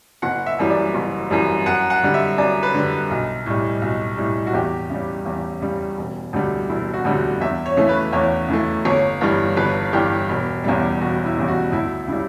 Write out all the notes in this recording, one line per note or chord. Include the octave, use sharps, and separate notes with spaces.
F#1 F#5
E5
F#2 E3 G3
D5
F#1
F#2 E3 G3
F#2 F#5
F#5
D3 G3
E5
F#2 D5
B4
D3 G3
B1
A2 G3
B1
A2 G3
F#4
E2 G4
C#3 G3
E2
C#3 G3
E1
D2 D3 G3
E1 E4
F#4
D2 D3 G3
E2 E5
C#5
C#3 E3 A3
B4
E2 C#5
C#3 E3 A3
G1 C#5
G2 E3 G3
G1 B4
G2 E3 G3 G4
E1
E2 C#3 G3
E1 F#4
E4
E2 C#3 G3
F#4
D2 E4
C#3 G3 E4